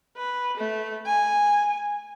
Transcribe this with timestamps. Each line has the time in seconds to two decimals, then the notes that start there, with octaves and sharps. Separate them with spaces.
0.17 B4
0.57 A3
1.06 G#5